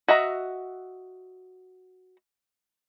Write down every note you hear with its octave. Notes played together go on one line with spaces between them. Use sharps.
F#4 D#5 E5 A#5